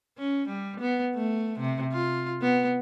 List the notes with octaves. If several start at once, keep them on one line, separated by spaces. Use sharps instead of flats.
C#4
G3
B3
A3
C3
F4
B3